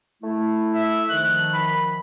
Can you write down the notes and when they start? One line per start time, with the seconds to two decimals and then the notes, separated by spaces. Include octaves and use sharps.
0.22 A3 E4
0.74 E5
1.09 D#3 F3 F#6
1.53 B5